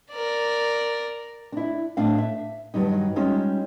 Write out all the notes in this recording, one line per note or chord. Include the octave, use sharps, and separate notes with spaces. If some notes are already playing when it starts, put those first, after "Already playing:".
A#4 D5
D4 E4
A2 D4 F5
E5
G2 D#3 F#3 G3 D#4
G3 G#3 C#4 D#4 F4